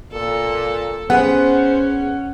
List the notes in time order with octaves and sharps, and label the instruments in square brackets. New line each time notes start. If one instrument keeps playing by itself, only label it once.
[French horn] A#2 [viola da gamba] A4
[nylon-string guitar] B3 G#4 [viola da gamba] C#4 [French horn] C5 [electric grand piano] F#5